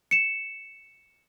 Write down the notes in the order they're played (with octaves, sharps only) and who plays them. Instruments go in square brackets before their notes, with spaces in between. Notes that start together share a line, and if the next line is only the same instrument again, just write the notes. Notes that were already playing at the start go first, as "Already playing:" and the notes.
[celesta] C#7 E7